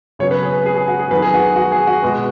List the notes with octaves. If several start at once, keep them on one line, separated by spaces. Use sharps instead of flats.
C#3 F#3 B3 C#5
B4
G#4
G#4
G#4
F#4
G#4
D#3 F#3 B3 B4
G#4
F#4
F#4
G#4
F#4
B2 G#3 B3